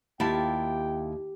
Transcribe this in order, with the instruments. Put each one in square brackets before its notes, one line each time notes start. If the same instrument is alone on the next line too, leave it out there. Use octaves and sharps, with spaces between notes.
[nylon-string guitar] D#2 [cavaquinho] E4 F4 A5 [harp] G4 [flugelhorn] G5